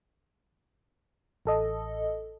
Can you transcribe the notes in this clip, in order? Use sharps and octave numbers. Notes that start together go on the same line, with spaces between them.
A1 A4 D#5